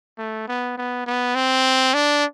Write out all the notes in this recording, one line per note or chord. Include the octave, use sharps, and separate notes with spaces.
A3
B3
B3
B3
C4
D4